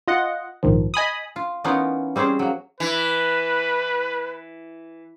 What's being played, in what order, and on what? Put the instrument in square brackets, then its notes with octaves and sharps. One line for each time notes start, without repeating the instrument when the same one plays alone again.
[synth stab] F4 D#5 F#5
A#1 G#2 D#3 F3
D#5 G#5 B5 D#6
[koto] F4
E3 B3 C#4 D#4 F4 A#4
G3 C4 C#4 G#4 C5
F#3 A#3
[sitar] E3 [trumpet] B4